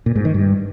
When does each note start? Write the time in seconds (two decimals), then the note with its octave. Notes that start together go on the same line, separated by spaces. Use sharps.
0.06 A#2
0.15 G#2
0.25 D#3
0.34 G2